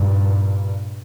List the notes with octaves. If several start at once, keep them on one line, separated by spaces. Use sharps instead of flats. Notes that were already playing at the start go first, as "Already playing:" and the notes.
Already playing: G2 A#2